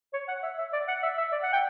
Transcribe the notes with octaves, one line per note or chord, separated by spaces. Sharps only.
C#5
F#5
E5
E5
D5
F#5
E5
E5
D5
F#5
G5